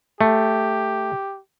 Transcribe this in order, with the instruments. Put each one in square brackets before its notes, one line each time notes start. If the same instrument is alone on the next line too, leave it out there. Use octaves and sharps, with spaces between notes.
[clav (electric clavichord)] A3 [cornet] G4